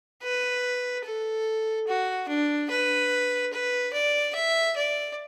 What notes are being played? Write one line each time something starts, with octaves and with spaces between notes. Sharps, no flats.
B4
A4
F#4
D4
B4
B4
D5
E5
D5